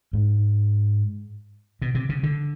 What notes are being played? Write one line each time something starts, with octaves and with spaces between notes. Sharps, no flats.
G#2
B2
C3
C#3
D3